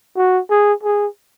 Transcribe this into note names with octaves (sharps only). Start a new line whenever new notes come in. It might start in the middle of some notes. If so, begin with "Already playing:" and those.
F#4
G#4
G#4